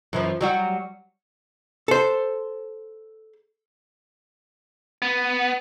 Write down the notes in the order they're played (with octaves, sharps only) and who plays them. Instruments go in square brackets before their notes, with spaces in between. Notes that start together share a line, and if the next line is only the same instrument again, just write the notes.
[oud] F#2 E3 F3
F#3 G3 F#4
[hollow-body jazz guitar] A4 C5
[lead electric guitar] B3